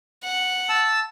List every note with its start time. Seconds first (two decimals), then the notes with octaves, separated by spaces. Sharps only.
0.24 F#5
0.69 A5 E6